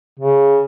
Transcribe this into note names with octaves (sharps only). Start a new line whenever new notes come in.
C#3